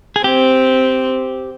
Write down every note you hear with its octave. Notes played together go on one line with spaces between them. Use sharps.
G#4
C4 G4